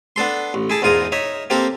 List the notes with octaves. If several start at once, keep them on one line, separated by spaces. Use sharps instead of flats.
B3 D4 A4 C6
A1
E4 G#4 A5
E2 G#2 F4 A#4 D#6
D#4 C#5 E5
A#3 C4 G4 A4 A#4